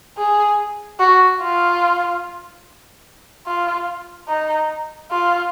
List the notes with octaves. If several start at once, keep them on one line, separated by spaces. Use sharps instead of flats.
G#4
F#4
F4
F4
D#4
F4